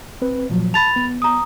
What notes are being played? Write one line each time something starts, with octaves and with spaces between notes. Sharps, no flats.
C4 B4
A#2 F3 F#3
A5 B5 A6 F7
B3
A#5 D#6